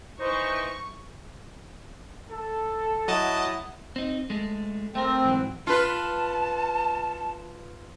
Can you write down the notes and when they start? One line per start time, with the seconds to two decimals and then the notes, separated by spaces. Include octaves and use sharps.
0.20 E3 D#4 C5 C#6
2.30 A4
3.08 F#3 E4 D#5 F#5 A5 D#6
3.96 C4 D#4
4.30 G#3 A3
4.95 A3 C4 A#4
5.24 G#2 E3 F#3
5.67 F4 B4 A5